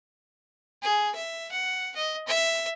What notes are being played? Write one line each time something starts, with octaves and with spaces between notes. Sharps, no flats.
G#4
E5
F#5
D#5
E5